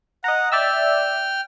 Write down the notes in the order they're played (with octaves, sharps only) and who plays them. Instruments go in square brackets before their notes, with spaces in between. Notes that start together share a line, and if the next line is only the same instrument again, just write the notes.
[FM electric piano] D#5 A#5 [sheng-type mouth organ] F#5
[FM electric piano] D5 E5 E6 [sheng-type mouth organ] G5 F6